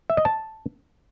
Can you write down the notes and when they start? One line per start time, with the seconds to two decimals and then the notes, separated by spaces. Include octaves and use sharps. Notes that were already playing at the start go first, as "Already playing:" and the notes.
0.10 E5
0.17 D#5
0.25 A5